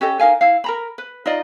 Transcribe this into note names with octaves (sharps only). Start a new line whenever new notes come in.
C#4 G4 A4 D#5
D#4 A#4 F5 G#5
E4 F5
A#4 A#5 B5
B4
D#4 F4 D5 D#5